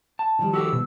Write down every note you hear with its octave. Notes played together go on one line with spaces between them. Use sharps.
A5
D#3 F3 G3
F#4 G4 A4 E6
B2